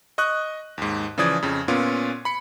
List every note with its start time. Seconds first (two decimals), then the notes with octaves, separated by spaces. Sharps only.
0.18 D#5 C#6 D#6 F#6
0.78 D#2 G#2
1.18 C#3 E3 F3 D5 D#6 G#6
1.42 F2 C#3
1.68 A#2 B3 C#4 F4
2.25 B5 C#7